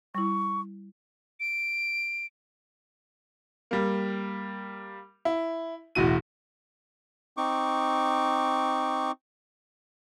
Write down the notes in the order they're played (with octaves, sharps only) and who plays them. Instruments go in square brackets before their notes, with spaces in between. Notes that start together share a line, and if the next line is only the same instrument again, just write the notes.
[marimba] G3 E4 [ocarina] C#6
[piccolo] D7
[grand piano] G3 A#3
E4
E1 A2 F#4 D#7
[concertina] C4 D#4 C#6 D6